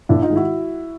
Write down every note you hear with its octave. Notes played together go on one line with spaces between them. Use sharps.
A#1 D4 E4
D#4 F4
G#2 D#3 G#3
E4 F#4